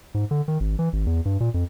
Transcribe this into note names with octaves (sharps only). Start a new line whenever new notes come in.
G#2
D3
D#3
G#1
E3
G#1
E2
G2
A#2
F2